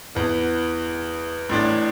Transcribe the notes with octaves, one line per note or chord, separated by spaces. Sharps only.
E2 E3 B3
A1 A2 E3 D4